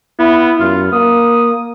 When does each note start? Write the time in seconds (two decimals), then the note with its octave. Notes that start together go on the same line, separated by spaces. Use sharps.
0.19 B3 E4
0.60 F#2 F4
0.93 A#3 D#6